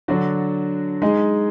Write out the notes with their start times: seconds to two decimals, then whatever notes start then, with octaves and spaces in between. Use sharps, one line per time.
0.08 D3 F#3 D4 F#4
1.02 G#3 D#4 G#4